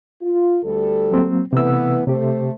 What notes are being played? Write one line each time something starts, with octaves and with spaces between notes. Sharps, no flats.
F4
D2 G3 A4
F#3 A#3 C4
C3 E3 A3 B3 E6
C3 A3 G4 C5